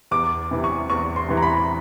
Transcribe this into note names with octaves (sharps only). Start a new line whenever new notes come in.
E2 D6
C3 E3
C#6
E2 C#6
C6
C3 E3
A#5
B5